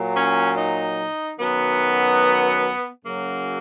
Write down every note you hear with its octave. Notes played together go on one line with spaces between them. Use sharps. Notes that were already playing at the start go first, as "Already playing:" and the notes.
Already playing: A#2 F#3
C#4
D#4
F#2 D#3 F#3 B3
F#2 C#3 F#3 A#3